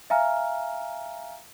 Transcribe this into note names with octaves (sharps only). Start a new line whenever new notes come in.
E5 F5 G#5 A#5 F6